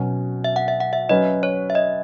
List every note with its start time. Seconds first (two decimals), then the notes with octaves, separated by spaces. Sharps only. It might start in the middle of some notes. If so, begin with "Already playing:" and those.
Already playing: B2 F#3 C#4 F#4
0.44 E5
0.56 F#5
0.68 E5
0.80 F#5
0.93 E5
1.09 F#3 C#4 F#4 B4 D#5
1.43 C#5
1.70 E5
1.75 D#5